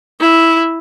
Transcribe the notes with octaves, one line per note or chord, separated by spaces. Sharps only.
E4